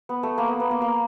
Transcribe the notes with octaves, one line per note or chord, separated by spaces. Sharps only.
B3
A3
A#3
B3
B3
A#3
A#3